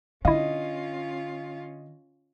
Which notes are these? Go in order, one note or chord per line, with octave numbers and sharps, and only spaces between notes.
D3 C#4 E4 F4 D#5 F5